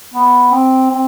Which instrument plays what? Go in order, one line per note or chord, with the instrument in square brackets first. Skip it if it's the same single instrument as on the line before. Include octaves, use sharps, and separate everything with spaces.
[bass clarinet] B3
C4
C4